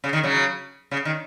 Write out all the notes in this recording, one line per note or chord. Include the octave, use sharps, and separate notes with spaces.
C#3
D#3
C#3 F#3
C#3
D#3